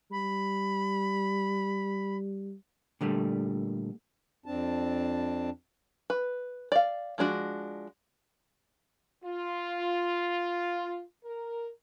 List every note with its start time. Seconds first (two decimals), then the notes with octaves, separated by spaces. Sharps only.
0.11 G3 B5
3.01 A#2 D3 G3 A3
4.46 F2 C4 D4 A5
6.10 B4
6.72 D5 F5
7.18 F3 G#3 D4 F#4
9.24 F4
11.24 A#4